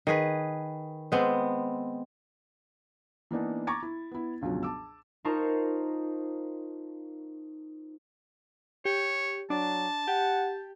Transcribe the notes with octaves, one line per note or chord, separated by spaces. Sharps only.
D#3 G#4 B4
G#3 B3 C4
E3 A#3 B3 D4 D#4
A#5 C#6 D6 G#6 A6
E4
B3 E4
G1 C#2 B2 F3 F#3
A5 D6 E6
D#4 F4 A#4 C5 A5 C#6
G4 C#5
F#3 D4 A5
G4 F#5